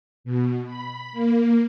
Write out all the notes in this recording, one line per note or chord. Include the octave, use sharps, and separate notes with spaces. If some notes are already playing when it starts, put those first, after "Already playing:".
B2
B5
A#3